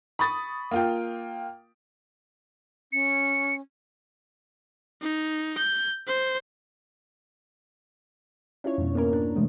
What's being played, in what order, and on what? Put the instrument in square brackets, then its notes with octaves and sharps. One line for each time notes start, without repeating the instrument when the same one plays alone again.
[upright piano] B5 C#6 D#6 A6
A#3 F4 G5
[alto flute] C#4 [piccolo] C#7
[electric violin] D#4
G6
C5
[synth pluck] C#4 D4 E4 F4 C#5
F2 G#2 B2
A#3 B3 C#4 A#4
D4
C3 E3 G#3 A3 B3